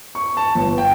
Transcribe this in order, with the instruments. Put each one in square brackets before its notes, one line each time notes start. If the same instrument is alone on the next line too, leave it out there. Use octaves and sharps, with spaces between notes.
[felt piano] C#6
A5
G1
G5